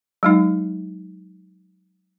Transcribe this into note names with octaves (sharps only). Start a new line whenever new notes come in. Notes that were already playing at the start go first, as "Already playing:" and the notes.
F#3 G#3 D#4